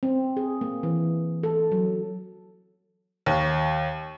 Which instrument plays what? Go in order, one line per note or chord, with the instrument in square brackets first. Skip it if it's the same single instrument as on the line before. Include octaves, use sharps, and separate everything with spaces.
[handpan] C4
G#4
A#3
E3
A4
F#3
[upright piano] D#2